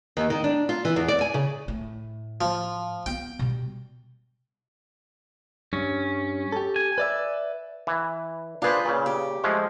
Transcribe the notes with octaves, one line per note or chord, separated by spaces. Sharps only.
D#2
D#3
D4
F4
E3
E2
D5
G#5
C#3
A2
F3
B3 F4 G5
B2 G3
G2 C#4
G4 A4
G#5
B4 D5 E5
E3
D4 F4 G#4 B4 C5
A#2 C#3
G4
F3 G#3 A3